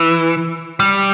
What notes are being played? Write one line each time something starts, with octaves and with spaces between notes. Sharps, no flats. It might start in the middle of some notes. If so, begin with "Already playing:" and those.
Already playing: E3
G3